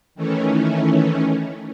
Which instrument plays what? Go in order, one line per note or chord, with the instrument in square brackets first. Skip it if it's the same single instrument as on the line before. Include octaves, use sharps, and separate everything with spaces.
[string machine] D#3 E3 A3 C#4